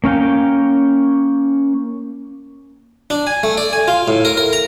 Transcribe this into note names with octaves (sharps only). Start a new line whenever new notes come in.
A#3 C#4 F5 G5
D4
G#5
A3
D5
G#5
F4
A2
A#4
A#4
A#5